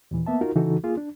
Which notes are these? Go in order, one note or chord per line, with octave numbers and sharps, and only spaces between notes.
D#2 A#2 E3
A#3 B3 E5 A5
D#4 F4 F#4 A#4
C#3 E3 D#4 F#4 A4
A#3 F4 G#4
D4